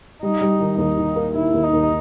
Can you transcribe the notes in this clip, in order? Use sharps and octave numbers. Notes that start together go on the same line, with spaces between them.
G3 D#4
G3
D#3
D#2 D#4
D#3
A#3
D#3 E4
D#2
D#4
D#2